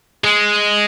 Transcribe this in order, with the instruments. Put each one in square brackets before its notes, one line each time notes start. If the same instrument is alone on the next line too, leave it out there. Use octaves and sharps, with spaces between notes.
[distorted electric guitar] G#3